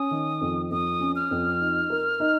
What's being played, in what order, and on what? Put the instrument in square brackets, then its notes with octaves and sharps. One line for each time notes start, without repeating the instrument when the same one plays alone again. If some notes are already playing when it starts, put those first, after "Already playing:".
Already playing: [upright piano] C#4 [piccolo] D#6
[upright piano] D#3
F2
[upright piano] F2 [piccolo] D#6
[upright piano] C#4
[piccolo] F6
[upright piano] F2
D#4
A#4
D#4